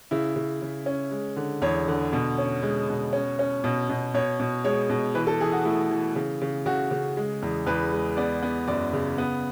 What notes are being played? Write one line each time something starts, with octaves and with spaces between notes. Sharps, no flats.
C#3 E4
C#3
C#3
C#4
G#3
D3
E2 C#5
D3
B2
C#4
G#3
B2
C#4
C#4
B2
B2
B2 C#5
B2
G#3 C#5
B2
E3 B4
A4
E3 G#4
F#4
A3 E4
E3
C#3
C#3
C#3 F#4
C#3
G#3
E2
E2 B4
G#3
B3 D5
B3
F#2 D5
C#3
B3